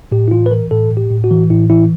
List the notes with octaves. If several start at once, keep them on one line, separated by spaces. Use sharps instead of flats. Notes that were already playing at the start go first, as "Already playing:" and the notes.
A2 G4
E4
E3 F4
B4
E3 A#4
A2 A4
A2
G4
A2
F#4
E3
A2 E4
E3 E4